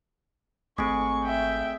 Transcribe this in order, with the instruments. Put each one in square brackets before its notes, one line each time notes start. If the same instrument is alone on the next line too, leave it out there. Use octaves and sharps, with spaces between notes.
[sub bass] G#1 [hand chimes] A3 C4 [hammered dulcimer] G#4 [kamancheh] C#6
[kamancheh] E5 G5